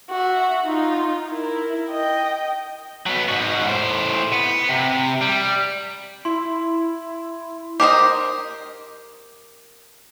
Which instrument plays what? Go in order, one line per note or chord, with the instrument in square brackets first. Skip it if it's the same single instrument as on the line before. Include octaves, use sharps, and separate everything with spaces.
[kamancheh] F#4 E5
D#4 F4
E4 A#4
D#5 G5
[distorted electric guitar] F#3 B3
G#2 F#4
A2 C5
B3
C3
G3
[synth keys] E4 [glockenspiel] C6
[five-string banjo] G4 A#4 C5 D#5